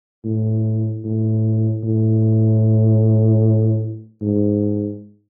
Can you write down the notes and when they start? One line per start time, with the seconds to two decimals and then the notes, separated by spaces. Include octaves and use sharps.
0.25 A2
1.05 A2
1.83 A2
4.22 G#2